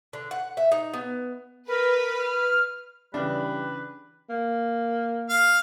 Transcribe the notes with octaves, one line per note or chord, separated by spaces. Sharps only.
D3
F#5
E5
D#4
B3
A#4 B4
F6
C#3 E3 G3 D4 B4
A#3
F5